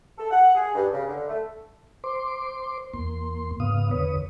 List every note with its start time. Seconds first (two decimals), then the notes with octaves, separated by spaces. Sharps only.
0.18 A4
0.31 F#5
0.55 G#4
0.74 G2
0.93 C#3
1.08 D3
1.28 A3
2.04 C5 C6 D6
2.93 E2 A#3 C6
3.60 G#2 C#3 B3 F5 D#6
3.91 E2 D3 B4 C#5 D#6